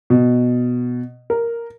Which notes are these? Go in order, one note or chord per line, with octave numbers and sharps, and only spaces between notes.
B2
A#4